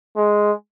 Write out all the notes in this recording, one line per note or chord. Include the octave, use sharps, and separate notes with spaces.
G#3